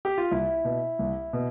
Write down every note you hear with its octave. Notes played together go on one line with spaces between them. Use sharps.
G4
F4
C2 E4
B2
C2
B2